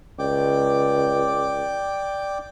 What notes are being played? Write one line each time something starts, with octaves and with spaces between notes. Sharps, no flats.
C#2 D5 G5 D6